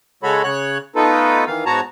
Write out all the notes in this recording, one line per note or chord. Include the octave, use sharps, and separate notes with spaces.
C#3 G#3 F#4 A4 C#5 B5
C#3 C#5 F#6
A3 B3 D#4 F4 A4 B4
D#3 E3 F5
G#2 B3 F#4 C#5 A5 A#5